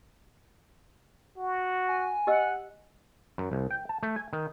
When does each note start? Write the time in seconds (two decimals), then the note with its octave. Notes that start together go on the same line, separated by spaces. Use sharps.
1.37 F#4
1.88 G#5
2.27 G4 D#5 F#5 E6
3.38 F#2
3.52 C2
3.71 G5
3.89 A5
4.03 A3
4.16 G#5
4.33 D#3